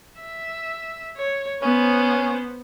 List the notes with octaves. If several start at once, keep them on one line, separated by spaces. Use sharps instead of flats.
E5
C#5
B3 C#4 C5